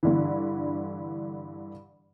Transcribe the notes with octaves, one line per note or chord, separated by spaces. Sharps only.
G2 D3 E3